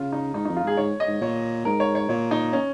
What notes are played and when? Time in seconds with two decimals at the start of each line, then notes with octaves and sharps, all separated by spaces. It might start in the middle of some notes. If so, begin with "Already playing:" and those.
Already playing: C#3 F4
0.12 D#4
0.34 G#2 D#4
0.45 F2 D#4
0.56 F4
0.63 G#2 G#4
0.77 G#2 C#5
1.00 D#5
1.07 G#2
1.21 A#2 C#5
1.65 G#2 A#4
1.80 C#5
1.95 C#5
2.09 A#2 C#5
2.31 D#4
2.53 C#4